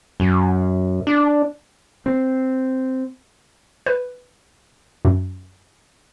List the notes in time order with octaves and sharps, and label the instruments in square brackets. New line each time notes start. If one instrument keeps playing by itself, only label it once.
[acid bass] F#2
D4
[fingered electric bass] C4
[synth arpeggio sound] B4
F#2